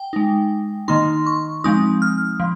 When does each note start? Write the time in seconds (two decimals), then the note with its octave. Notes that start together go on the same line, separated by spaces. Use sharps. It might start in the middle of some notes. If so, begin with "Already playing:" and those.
Already playing: G5
0.13 G#3 D#4
0.88 D#3 A#3 D#4 C6
1.26 C#6
1.64 F3 G#3 C4 D#4 D#6
2.02 F6
2.40 F3